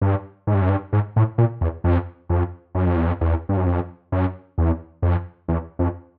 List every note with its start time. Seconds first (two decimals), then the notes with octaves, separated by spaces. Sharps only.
0.01 G2
0.47 G#2
0.54 G2
0.62 F#2
0.69 G2
0.93 G#2
1.16 A2
1.38 A#2
1.61 E2
1.84 F2
2.29 F2
2.75 F#2
2.86 F2
2.96 E2
3.07 F2
3.21 E2
3.49 G2
3.57 F#2
3.66 F2
4.12 F#2
4.58 E2
5.02 F2
5.48 E2
5.79 F2